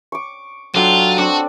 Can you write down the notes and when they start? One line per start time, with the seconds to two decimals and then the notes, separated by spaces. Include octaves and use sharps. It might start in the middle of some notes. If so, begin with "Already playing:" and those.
0.12 C#6 D6
0.75 F#3 D4 F4 A4 G5
1.18 C4 D4 F#4